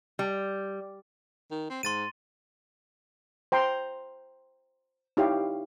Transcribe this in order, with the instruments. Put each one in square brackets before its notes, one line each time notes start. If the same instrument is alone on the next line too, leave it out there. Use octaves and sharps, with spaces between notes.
[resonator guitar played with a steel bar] G3
[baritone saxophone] D#3
C4
[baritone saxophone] G#2 [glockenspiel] C6 A6 D#7
[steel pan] C5 G5 A#5 C6
D#4 E4 G4 C#5 F5